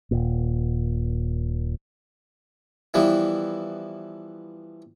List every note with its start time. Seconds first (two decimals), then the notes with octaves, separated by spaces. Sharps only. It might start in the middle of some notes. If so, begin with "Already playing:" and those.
0.11 D#1 A#2
2.94 E3 F3 G3 B3 E4